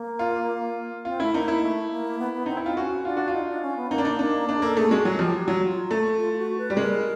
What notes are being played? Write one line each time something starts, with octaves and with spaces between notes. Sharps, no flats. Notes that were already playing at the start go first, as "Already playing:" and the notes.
Already playing: A#3
F4
C4 F4
A3 E4
A#3 D#4
E4
A3
A#3
B3
B3
C4 D#4
E4
C4 F4
C#4 F#4
D4 F4
F#4
F4
D#4
D4
C#4
B3
A#3 D#4
D4
D#4
A#3 D4
D4 D#4
G#4
A#3 A4
A3 G#4
G#3 F#4
F#3 F#4
F3 G4
G4
F#3 F#4
F4
A3
F4
F4
F#4
B4
G3
G#3 A#4